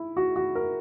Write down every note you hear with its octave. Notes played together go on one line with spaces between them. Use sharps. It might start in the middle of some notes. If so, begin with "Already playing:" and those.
Already playing: E4
F#4
F#4
A#4